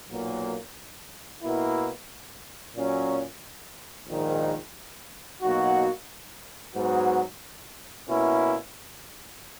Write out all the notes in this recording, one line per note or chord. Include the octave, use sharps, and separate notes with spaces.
B1 A#2 F#3 A#3
B2 A#3 E4
A#2 F#3 C#4
A#1 G#2 D#3
B2 F#3 A#3 D#4 F#4
G#2 F#3 B3 F#4
B2 A#3 C#4 E4